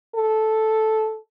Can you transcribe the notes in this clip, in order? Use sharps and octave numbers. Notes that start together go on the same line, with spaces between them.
A4